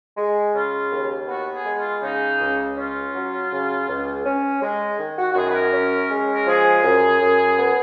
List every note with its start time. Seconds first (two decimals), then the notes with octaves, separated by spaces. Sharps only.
0.17 G#3
0.55 C#3 F4
0.92 D#2
1.29 B3 F#4
1.54 G#4
1.66 G#3
1.78 F4
2.03 C#3 D#4
2.39 C#2
2.77 C#4 F4
3.14 F#3
3.51 C#3
3.88 C#2
4.25 C#4
4.62 G#3
4.99 D#3
5.18 F#4
5.32 F#4
5.35 F#2 G#4
5.48 B4
5.54 A#4
5.73 C#4
6.11 G#3
6.35 A#4
6.46 F3 G#4
6.84 F#2
7.21 F#2
7.58 B3